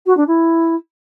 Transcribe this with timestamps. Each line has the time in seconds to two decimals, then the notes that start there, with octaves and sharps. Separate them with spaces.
0.06 F#4
0.17 D4
0.27 E4